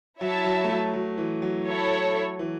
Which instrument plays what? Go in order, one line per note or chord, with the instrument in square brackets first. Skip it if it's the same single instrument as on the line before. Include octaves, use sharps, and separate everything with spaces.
[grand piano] F#3 [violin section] E4 C#5 E5 A5
[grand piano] F#3
A3
F#3
F#3
E3
F#3
[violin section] E4 A4 C#5
[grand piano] E3